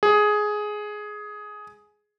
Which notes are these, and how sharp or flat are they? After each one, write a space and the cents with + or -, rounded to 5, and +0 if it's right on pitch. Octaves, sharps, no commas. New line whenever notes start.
G#4 +10